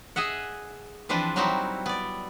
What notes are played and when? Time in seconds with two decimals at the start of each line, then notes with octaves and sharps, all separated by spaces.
0.16 G#4 D#5 E5 F#5
1.09 E3 F3 C4 D4 B4
1.36 F#3 G3 C4 D#4 E4 F#4
1.86 B3 D5